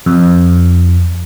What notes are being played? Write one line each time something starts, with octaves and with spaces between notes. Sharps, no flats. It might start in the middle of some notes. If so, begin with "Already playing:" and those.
F2